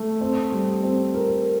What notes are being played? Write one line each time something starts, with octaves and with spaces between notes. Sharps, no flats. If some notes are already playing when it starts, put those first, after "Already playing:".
Already playing: A3
C4
G3
C4
A#4